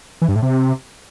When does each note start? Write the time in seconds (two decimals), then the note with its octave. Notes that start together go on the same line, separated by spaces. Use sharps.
0.22 E3
0.29 G2
0.36 A2
0.42 C3